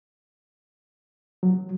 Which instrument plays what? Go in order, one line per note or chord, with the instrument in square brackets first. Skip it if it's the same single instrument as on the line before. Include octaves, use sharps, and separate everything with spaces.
[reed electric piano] F#3